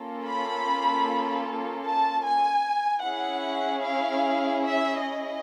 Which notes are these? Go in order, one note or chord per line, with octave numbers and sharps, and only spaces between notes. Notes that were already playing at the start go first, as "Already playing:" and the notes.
Already playing: A#3 C#4 F4 A4
B5
A5
G#5
C#4 E4 G#4 F#5
F5
E5
D#5